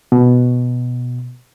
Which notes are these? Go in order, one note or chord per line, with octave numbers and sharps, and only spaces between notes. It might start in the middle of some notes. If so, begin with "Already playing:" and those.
B2